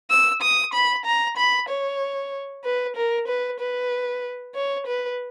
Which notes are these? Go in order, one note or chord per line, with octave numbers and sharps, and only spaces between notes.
E6
D#6
B5
A#5
B5
C#5
B4
A#4
B4
B4
C#5
B4